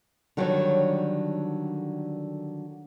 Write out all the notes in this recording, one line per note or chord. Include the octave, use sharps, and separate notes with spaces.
D3 D#3 F#3 G3 A4 C#5